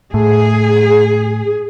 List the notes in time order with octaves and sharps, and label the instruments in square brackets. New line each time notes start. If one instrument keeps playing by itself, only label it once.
[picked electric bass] A2 [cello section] G#4